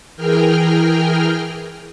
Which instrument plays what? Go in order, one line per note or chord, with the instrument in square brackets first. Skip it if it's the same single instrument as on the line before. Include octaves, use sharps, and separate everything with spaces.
[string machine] E3 G#4 A#4 G5 F6